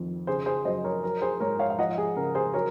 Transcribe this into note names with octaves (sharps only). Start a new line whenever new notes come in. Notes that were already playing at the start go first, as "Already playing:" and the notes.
Already playing: F2 D#3
C#3 G#4 C5
G#4 C5
F#2 C5 D#5
A#4 C#5
F#3 A#4
G#4 C5
G#2 A#4 C#5
C#5 F5
F5
F3 D#5 F#5
G#4
C#3 A#4
G#4 C5
F#3 A#4 C#5